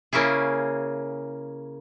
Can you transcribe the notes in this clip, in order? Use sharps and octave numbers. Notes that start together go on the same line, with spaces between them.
C#3 A#3 C#4 E4 G#4